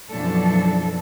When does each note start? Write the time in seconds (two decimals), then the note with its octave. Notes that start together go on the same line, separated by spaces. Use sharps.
0.10 F#2 B2 E3 F3 D4 A4